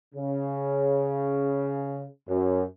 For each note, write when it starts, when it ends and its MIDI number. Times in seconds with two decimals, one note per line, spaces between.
0.15 2.04 49
2.29 2.63 42